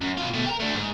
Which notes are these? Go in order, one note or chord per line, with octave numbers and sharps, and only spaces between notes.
F#2
B2 F4
B2 A3
G4 A#4
A3 D4
G#2